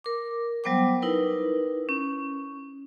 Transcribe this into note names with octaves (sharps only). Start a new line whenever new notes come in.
A#4 D6
F#3 G3 B3 C5 G5 D6
D#4 E4 A#4 B4
C#4